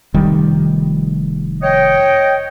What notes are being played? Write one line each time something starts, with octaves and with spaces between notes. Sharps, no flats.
F1 D#3 G3
C#5 D#5 G5